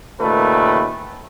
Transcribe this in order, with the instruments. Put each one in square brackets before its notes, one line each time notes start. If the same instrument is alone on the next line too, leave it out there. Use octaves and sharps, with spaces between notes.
[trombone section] D#2 A#2 C#3 A3 B4